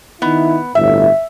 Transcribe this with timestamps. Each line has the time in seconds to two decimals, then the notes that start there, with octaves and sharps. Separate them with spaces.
0.22 D#3 B3 D#4 E4
0.75 G1 D2 A2 E5